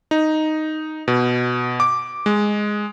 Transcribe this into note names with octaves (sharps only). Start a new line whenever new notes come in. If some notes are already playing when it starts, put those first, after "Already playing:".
D#4
B2
D6
G#3